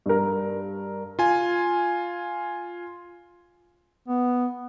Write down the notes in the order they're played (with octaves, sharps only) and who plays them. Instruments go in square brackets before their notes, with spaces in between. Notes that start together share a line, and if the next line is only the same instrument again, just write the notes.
[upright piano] G2 A#4
[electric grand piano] F4 G#5
[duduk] B3